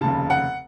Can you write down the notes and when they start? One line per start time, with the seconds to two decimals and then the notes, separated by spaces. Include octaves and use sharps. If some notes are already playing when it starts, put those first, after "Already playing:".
0.01 F1 D#2 C#3 A5
0.30 F#5